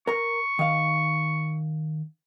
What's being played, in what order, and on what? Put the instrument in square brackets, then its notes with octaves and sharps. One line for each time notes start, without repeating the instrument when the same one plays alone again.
[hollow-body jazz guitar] A#4 A#5 [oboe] C#6
[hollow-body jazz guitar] D#3 F5